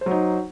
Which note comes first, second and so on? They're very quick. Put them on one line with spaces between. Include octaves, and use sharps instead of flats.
C5 F#3 D#4